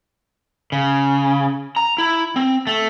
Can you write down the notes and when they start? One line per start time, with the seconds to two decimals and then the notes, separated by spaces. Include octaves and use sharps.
0.72 C#3
1.76 A#5
1.98 E4
2.36 C4
2.67 A3